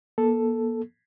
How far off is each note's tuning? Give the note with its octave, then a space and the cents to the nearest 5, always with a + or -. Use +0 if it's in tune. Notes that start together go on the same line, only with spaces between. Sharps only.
A#3 +40 A4 +0